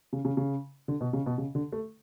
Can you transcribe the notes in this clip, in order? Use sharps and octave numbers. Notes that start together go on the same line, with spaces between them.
C#3
C#3
C#3
D3
B2
C#3
B2
C#3
D3
A3